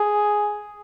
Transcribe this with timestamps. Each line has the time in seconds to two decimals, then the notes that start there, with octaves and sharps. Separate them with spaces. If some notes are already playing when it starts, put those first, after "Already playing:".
Already playing: G#4